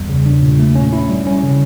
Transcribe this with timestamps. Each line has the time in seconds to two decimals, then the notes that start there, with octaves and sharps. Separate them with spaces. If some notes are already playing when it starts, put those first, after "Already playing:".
Already playing: E2 G3
0.09 C#3
0.26 D4
0.42 A#2
0.59 A3
0.75 C#4
0.93 E4
1.10 G3
1.27 C#4
1.43 C#3